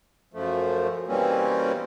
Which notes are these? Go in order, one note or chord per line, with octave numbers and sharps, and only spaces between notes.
F#2 F3 A3
B2 E3 G3 A#3 C4 C#4